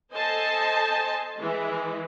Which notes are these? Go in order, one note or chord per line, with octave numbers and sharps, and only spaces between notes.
A4 C5 D#5 G#5 A5
E3 G#3